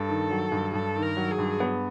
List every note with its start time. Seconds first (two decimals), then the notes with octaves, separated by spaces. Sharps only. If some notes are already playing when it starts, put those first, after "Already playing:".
Already playing: G2 A4
0.09 D#3
0.31 F#3
0.52 G2
0.73 G2 A4
0.96 D#3
1.02 A#4
1.17 F#3
1.31 G#4
1.38 G2
1.60 B3